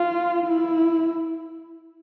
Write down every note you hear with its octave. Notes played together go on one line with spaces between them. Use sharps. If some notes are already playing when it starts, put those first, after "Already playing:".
Already playing: F4
E4